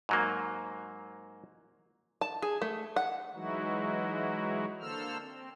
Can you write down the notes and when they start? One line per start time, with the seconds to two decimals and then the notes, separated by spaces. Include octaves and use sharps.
0.09 G#2 F#3 A#3
2.21 A5
2.42 G#4
2.62 A3
2.96 F#5
3.35 E3 F#3 G#3 D#4 E4 F#4
4.81 D3 A#3 A4 C5 E6 F6
5.21 C4